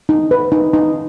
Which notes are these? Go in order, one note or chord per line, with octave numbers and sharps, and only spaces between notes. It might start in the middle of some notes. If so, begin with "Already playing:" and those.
D#4
B4
D#4
D#4